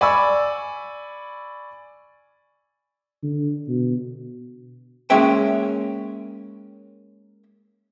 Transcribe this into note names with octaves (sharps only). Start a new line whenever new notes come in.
D5 G#5 B5 C#6 E6
D3
B2
G#3 A#3 C#4 E5 G5